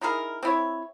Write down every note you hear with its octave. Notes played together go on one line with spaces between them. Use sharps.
D#4 E4 G#4 A#4
C4 E4 C#5